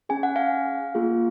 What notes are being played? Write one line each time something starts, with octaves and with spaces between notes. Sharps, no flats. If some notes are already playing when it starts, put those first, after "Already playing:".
C#4 G#4 G#5
F#5
F5 G#5
A#3 F4 G#4